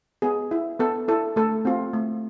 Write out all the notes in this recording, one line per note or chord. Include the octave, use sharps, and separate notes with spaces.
B3 G#4
E4
B3 A4
E4 A4
A3 A4
C4 F4
A3